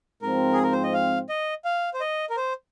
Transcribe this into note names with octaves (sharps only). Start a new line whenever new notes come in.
G#2 F3 C4 A#4
G#4
A#4
C5
D#5
F5
D#5
F5
C5
D#5
A#4
C5